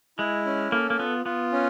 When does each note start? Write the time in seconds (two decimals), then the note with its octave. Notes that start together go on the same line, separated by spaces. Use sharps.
0.19 G#3 E4
0.46 C#4
0.72 A#3 A4
0.90 A#3
0.99 B3 F4
1.25 B3 F4
1.52 C#4